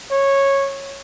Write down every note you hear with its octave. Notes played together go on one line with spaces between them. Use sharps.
C#5